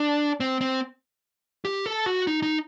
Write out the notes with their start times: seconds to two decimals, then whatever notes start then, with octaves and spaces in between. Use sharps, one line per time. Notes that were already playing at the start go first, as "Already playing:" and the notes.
Already playing: D4
0.40 C4
0.61 C4
1.65 G4
1.86 A4
2.06 F#4
2.27 D#4
2.42 D#4